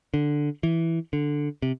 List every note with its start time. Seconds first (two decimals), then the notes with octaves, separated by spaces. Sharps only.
0.14 D3
0.63 E3
1.13 D3
1.62 C3